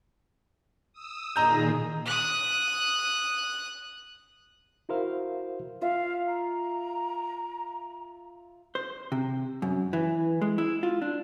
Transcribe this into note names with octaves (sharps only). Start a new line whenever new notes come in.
D#6 E6
A#2 D#3 G#4 D#5 A#5 G6
D#6 F#6
E4 F#4 A#4 C5 E5 F5
F4 E5 F5
A#5
C5
C3
F#2
E3
G#3
E4
F4
D4